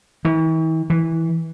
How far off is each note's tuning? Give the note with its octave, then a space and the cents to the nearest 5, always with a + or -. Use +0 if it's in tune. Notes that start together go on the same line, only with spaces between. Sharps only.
E3 -45
E3 -15